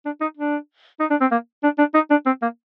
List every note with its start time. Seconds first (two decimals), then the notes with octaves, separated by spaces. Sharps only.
0.05 D4
0.21 D#4
0.37 D4
1.00 D#4
1.10 D4
1.21 C4
1.31 A#3
1.63 D4
1.78 D4
1.94 D#4
2.10 D4
2.26 C4
2.42 A#3